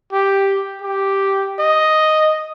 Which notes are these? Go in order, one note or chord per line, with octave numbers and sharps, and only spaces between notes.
G4
G4
D#5